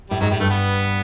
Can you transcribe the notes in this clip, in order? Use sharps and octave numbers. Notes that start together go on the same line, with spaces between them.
A2 G3
G#2 F#3
A2 G3
G2 A3
B3